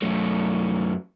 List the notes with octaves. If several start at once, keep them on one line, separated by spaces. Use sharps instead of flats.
F#2 A3